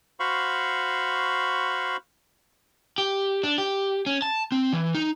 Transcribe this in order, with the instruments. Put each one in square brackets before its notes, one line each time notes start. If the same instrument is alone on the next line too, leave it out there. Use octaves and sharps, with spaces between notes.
[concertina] F#4 C5 F5 B5 C#6
[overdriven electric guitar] G4
D4
G4
C#4
A5
C4
E3
D#4